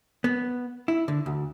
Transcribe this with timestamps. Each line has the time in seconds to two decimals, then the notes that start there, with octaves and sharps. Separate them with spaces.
0.24 B3
0.88 E4
1.08 D3
1.26 D2